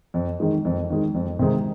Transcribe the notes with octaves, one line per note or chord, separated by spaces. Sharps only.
F2
D#3 G#3
F2
D#3 G#3
F2
C3 D#3 G#3 D#4